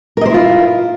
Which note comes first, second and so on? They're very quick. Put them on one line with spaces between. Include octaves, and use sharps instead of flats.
A#4 D#5 C5 E4 F4